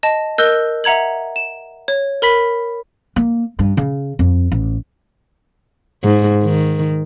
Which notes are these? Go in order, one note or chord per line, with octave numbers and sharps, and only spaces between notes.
D#5 A5
A#4 D#5 E6 F#6 G6 G7
E5 F#5 A#5 G#6 F#7
E7
C#5
A#4 B5 B6
A#3
G2
C#3
F2
A1
G#2
D#3